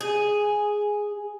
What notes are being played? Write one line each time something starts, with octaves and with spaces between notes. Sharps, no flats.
G#4